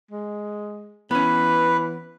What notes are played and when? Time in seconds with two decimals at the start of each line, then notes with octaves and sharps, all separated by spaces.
0.11 G#3
1.11 E3 B3 C#4 B4